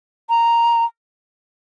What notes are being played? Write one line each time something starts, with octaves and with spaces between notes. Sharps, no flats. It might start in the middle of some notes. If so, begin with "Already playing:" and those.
A#5